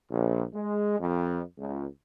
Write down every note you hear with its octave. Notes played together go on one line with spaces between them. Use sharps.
A#1
G#3
F2
C#2